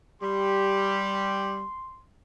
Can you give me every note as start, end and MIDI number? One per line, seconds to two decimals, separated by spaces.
0.22 1.63 55
0.22 1.63 67
0.22 2.00 84